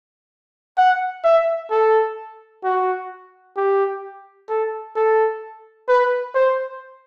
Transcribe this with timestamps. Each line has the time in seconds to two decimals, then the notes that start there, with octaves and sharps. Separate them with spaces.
0.78 F#5
1.24 E5
1.71 A4
2.64 F#4
3.56 G4
4.49 A4
4.96 A4
5.89 B4
6.35 C5